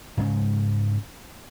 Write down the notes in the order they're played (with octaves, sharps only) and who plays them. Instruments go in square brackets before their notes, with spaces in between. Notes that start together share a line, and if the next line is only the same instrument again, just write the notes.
[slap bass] G#2 C#3 G#3 C#4